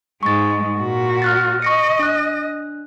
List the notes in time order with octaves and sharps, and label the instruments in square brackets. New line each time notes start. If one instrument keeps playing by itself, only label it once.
[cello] G#2 G#3 [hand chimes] C#6 A6
[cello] A#2 F#4
[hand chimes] F6 F#6 A6
[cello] D#5 [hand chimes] C#6 A#6 C#7
[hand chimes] D4 F#6